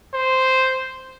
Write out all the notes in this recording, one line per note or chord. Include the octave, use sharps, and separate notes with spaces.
C5